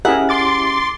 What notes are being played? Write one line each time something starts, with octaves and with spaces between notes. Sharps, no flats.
C#4 E4 G4 G#4 A#4 E5 F#5
C6 D6 A6